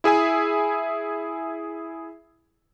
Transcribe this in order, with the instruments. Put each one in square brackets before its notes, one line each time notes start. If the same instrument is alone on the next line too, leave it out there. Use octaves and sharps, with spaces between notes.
[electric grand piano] E4 G#4 E5 G#5